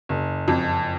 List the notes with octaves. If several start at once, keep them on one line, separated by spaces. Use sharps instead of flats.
F#1
F2